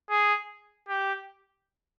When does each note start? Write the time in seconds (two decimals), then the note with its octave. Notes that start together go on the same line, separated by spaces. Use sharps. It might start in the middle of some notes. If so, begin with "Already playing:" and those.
0.10 G#4
0.89 G4